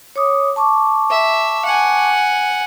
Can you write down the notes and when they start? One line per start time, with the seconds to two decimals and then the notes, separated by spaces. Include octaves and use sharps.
0.16 C#5 D6 D#6
0.56 A5 C#6 D6
1.11 E5
1.66 F#5 G#5